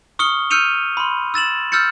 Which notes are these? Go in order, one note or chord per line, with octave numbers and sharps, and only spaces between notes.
C#6 D#6 F6 C#7 G7
E6 F6 G6 C#7 D#7 F7
B5 C6
E6 A6 E7 F#7
E6 F6 G6 A6 C#7